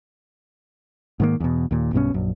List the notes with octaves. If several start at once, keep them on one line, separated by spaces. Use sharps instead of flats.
G#2 D#3 A#3
E2 B2
D#2 A#2
B1 G2 B2 C#4
A#1 F#2